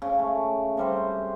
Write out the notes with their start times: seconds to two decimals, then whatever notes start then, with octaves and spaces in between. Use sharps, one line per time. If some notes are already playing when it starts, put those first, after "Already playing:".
0.02 C#3
0.19 A3
0.77 C3 G3 C5